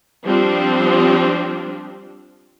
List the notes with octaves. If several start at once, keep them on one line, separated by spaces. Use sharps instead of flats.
F3 G3 C4 D4